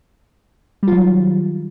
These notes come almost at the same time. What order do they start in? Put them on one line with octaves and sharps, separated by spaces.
G3 F4 F#3 D#3